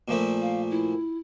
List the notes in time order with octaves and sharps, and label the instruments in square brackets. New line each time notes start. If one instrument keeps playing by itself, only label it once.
[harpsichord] A#2 F3 A3
[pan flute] F5
E4